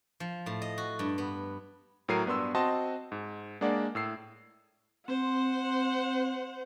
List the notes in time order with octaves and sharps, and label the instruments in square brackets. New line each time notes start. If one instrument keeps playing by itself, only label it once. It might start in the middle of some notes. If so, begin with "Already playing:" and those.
[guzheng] F3
A2
D#5
F#4
G2
B3
[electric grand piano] A2 F#3 A#4 C7 D#7
G2 B3 D4 C6 E6
C4 F#4 D#5 A5 C6
G#2
G#3 A#3 D4 D5 F#5
A2 E6 C7
[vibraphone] C4 [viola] C5 F#5